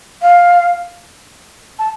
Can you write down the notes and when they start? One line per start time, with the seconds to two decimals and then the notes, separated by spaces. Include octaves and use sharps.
0.22 F5
1.79 A5